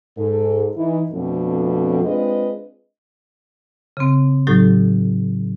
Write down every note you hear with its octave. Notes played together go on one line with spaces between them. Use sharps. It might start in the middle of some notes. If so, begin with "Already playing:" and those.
G#2 A4
E3 D#4
F2 B2 F3 A3 C4 D4
G#3 C4 D4 F4 B4 D#5
C#3 C4
A2 F#3 D#4 G4 A4